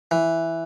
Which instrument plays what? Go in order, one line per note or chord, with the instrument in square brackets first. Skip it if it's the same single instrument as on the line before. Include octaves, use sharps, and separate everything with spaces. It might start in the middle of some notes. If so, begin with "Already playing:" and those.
[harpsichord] E3